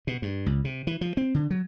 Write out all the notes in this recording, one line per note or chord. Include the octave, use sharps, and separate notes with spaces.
B2
G2
C#2
C3
E3
F3
C4
D3
F#3